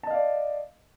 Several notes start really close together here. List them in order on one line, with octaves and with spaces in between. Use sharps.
A5 D#5 F5 D5